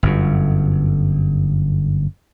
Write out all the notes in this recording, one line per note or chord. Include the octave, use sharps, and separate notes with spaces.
G1 F#2